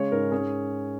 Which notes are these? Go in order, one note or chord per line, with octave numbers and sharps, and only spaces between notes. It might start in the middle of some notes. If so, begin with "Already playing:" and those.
Already playing: C#3 G#3 C#5
G#2 A#4
C#4 G#4